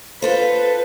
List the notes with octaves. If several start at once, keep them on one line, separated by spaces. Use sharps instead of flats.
F4 A4 B4 C5